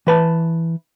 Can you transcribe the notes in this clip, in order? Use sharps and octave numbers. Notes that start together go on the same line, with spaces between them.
E3 B4 A5